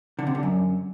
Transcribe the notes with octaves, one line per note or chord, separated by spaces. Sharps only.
D3
C3
D3
F#2